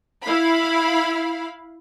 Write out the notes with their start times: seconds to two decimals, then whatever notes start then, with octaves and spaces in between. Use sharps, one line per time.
0.23 E4 F5 B5